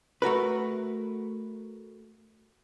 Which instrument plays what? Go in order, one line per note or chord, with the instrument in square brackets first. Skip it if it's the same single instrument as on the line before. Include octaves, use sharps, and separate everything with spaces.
[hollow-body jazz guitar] A3 F#4 A#4 B4